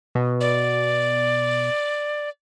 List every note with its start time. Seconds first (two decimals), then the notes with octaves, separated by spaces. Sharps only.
0.15 B2
0.41 D5